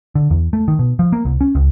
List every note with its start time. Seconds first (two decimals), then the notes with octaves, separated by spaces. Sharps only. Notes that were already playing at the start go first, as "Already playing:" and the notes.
0.15 D3
0.30 E2
0.53 A3
0.68 D#3
0.79 B2
0.99 F3
1.12 A#3
1.25 C2
1.41 C#4
1.55 C#2